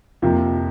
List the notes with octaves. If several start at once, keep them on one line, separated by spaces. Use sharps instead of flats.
F2 C3 F3 A#3